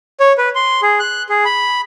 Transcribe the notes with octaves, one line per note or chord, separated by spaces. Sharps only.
C#5
B4
C6
G#4
F#6
G#4
B5